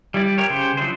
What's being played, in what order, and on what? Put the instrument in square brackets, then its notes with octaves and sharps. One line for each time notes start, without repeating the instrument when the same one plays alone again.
[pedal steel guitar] G3 E4 D5
E4 G4 A#4 C#5
C#3 G4 C5
F3 F#3 D4 E4 C5